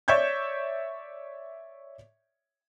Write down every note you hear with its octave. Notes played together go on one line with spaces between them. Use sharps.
C#5 D5 E5 C#6 G6 G#6